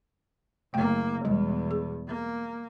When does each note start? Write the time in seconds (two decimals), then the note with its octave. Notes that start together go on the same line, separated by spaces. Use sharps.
0.74 F#1 A3 A#3 G5
1.25 E2 B2 G3 G#3
1.71 G#4
2.08 A#3